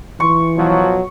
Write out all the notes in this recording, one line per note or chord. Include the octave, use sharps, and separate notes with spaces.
E3 C#6
B2 F3 F#3